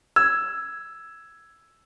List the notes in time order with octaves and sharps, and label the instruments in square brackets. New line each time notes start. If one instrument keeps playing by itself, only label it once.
[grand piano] E6 [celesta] G#6